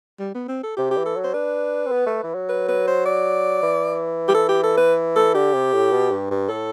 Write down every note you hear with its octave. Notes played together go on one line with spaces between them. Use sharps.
G3
B3
C4
A4
C3 G4
G4
E3
A4
F#3
C5
D4 B4
C4
B3
A3
E3
F#3
B4
B4
C5
D5
E3
G4
A4
G4
A4
B4
A4
D3 G4
C3
A2
B2
G2
G2
A2 A4